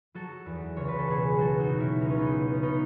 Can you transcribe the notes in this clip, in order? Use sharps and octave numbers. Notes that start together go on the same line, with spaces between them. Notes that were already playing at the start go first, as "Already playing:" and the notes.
F#3 F#4 A4
E2
C#2 C#5
B4
A4
B2 G#4 B4
F#3 F#4 A4
D#4 F#4
B2
C#4 E4 F#4
C#2 D#4
C#4
B3 D#4
B2
C#4
B2 B3 D#4